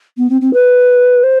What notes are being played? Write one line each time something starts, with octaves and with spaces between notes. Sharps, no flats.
B3
C4
C4
B4
C5